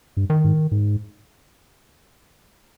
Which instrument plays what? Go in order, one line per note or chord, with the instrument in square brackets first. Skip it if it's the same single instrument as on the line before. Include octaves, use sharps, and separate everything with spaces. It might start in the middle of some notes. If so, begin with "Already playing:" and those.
[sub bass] G2
[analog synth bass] D#3
[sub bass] G#2
G#2